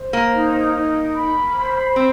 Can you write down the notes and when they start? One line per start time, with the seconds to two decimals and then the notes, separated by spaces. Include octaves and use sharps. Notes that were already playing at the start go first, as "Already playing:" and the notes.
Already playing: C5
0.13 A#3
0.34 D#4
0.74 D#4
1.14 B5
1.55 C5
1.95 C4 C6